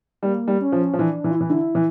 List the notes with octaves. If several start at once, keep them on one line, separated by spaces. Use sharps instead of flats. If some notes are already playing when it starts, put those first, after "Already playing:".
G3 A#3
G3
C#4
F3
F3
E3 D4
E3
F4
E3 E4
D3
E3